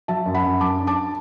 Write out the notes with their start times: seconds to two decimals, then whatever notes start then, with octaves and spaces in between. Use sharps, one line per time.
0.08 F#3 E5 A5
0.26 F#2
0.35 F#5 B5
0.43 F#2
0.61 F#2 A5 D6
0.79 D4
0.87 A5 D6